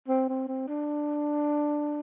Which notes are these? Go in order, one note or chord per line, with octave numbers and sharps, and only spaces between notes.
C4
C4
C4
D4